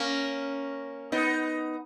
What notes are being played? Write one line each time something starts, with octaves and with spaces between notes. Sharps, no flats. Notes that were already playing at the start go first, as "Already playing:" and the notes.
Already playing: A#3 C#4
B3 D#4